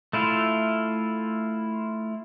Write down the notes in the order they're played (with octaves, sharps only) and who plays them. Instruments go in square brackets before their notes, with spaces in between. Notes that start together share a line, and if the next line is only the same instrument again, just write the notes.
[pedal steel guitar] A3 E4 F4